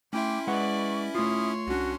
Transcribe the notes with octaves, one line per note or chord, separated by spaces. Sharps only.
A3 C#4 E4 E5 G5 C6 D6
G#3 B4 D5 F#5 C#6
A3 F4 C#5 C6 D#6
C2 C#4 D4 F#4